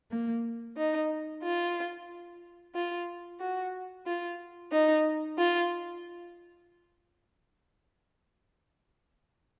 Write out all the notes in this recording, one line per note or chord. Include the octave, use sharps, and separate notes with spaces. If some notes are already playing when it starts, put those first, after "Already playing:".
A#3
D#4
F4
F4
F#4
F4
D#4
F4